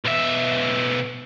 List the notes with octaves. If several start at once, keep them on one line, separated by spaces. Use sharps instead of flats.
B1 E5